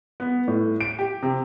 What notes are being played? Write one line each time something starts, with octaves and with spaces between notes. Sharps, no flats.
B3
A2
D7
G4
C3